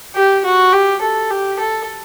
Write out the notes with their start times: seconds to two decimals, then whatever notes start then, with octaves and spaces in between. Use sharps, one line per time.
0.15 G4
0.44 F#4
0.72 G4
1.01 A4
1.30 G4
1.58 A4